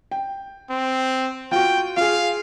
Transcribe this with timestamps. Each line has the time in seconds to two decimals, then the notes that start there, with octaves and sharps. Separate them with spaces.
0.11 G5
0.70 C4
1.52 F4 F#4 G5
1.97 F4 G#4 F5